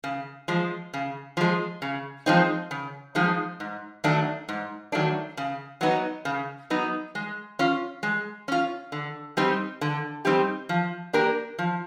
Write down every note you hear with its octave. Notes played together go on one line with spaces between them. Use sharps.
C#3
F3 G#3
C#3
F3 G#3
C#3
F3 G#3 C4 D#4
C#3
F3 G#3 C4 D#4
G#2
D#3 F#3 A3 D4
G#2
D#3 F#3 A3 D4
C#3
F#3 B3 D#4
C#3
F#3 B3 D#4
G#3
C#4 F4
G#3
C#4 F4
D3
G3 C4 D#4 G4
D3
G3 C4 D#4 G4
F3
A#3 D4 G4 A#4
F3